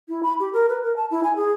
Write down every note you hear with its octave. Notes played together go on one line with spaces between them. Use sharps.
E4
B5
G4
A#4
B4
A#4
A5
E4
G#5
G#4